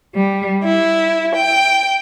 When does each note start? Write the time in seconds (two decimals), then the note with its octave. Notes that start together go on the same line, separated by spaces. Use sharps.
0.14 G3
0.64 E4
1.34 G5